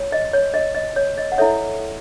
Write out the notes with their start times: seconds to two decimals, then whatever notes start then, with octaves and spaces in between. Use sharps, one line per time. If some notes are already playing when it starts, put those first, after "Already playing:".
Already playing: C#5
0.12 D#5
0.33 C#5
0.54 D#5
0.75 D#5
0.96 C#5
1.18 D#5
1.32 F#5
1.38 E4 A4 C#5 E5